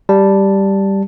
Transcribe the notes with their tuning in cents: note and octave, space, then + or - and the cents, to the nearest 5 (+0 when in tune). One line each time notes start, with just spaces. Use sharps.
G3 +0 A5 +0